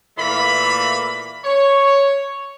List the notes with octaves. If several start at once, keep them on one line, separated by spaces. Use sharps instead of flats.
A#2 E3 A3 A#3 B5
C#5